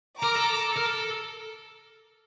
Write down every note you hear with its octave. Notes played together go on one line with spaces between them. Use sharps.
A#4 A#5 D6
A4
A#4
A4